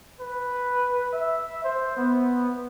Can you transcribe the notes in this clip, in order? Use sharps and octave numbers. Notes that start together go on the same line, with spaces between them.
B4
E5
C5
B3